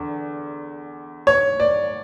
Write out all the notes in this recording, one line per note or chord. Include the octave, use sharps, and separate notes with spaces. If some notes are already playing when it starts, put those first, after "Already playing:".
Already playing: E2 D3
C#5
D5